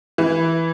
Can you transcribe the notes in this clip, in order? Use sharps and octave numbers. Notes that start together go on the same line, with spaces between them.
E3